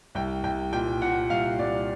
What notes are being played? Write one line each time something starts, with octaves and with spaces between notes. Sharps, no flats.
C2 G5
C2 G5
A#2 G5
A#2 F#5
C2 F5
C2 D5